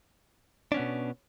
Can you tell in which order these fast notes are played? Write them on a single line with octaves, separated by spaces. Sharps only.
D4 C#4 B3 B2